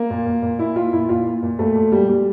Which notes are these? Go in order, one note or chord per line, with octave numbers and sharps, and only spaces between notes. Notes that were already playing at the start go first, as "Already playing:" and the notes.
Already playing: A#3
A#2
A#2
A#2
A#2 E4
A#2 F4
A#2 E4
A#2 F4
A#2
A#2
A#2 A3
A#2
A#2 G3
A#2 G3